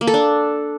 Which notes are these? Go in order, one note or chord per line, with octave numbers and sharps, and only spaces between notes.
A#3
A4
D4